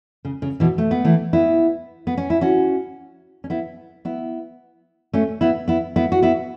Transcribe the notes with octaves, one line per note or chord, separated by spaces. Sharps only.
C#3
C#3
B2 E3
A3
B3
E3 A3
B3 E4
B3
C#4
E4
C#4 F#4
C#4
B3 E4
B3 E4
A3 C#4
B3 E4
B3 E4
B3 E4
F#4
B3 E4